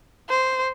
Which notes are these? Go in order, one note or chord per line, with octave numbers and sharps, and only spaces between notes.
C5